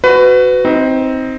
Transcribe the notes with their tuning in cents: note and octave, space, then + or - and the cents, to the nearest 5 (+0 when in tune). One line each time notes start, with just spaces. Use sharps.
F#4 +0 B4 +25
C4 +0 D#4 +20